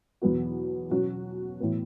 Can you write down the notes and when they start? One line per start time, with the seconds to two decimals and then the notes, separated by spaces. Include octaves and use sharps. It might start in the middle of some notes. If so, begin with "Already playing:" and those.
0.22 E2 B2 F#3 B3 F#4
0.90 B2 F#3 C#4 F#4
1.60 A2 E3 B3